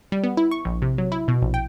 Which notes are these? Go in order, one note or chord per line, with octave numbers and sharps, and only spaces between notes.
G3
B3
E4
C#6
A#1
C3
F#3
E4
B2
A#1
G5